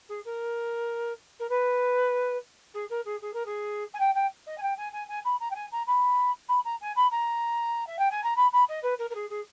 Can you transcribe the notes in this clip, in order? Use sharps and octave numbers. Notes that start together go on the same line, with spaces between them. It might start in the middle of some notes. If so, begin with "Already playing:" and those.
G#4
A#4
A#4
B4
G#4
A#4
G#4
G#4
A#4
G#4
G#5
G5
G5
D#5
G#5
G5
G#5
G#5
G#5
B5
A#5
G5
G#5
A#5
B5
B5
A#5
G#5
B5
A#5
E5
G5
G#5
A#5
B5
B5
D#5
B4
A#4
A#4
G#4
G#4